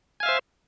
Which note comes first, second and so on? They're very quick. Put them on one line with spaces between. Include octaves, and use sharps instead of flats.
G#5 F5 E5 C5